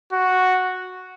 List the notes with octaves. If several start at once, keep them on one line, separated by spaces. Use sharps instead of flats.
F#4